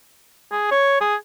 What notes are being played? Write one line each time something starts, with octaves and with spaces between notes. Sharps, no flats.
G#4
C#5
G#4